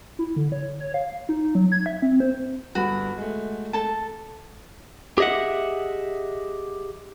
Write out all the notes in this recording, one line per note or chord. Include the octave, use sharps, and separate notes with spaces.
E4
D3
C#5
C#5
F5
D#4
F#3
G#6
E5
C4
C5
G1 G2 F#4 B5
G#3 A3
A4 A5
G4 G#4 D#5 E5 F#5